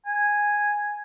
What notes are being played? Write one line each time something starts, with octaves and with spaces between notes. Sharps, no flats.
G#5